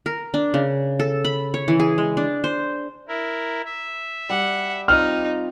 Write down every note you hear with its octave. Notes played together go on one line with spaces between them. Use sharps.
A#4
D4
C#3
A4
B5
C#5
E3
G#4
G#3
D4
C5
E4 A#4
E5
G3 G4 F#5
C4 D#4 F4 F6